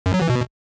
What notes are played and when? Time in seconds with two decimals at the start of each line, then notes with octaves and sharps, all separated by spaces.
0.06 F#2
0.14 F#3
0.22 E3
0.29 B2